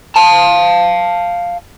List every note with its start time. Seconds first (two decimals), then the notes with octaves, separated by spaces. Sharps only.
0.16 F5 A5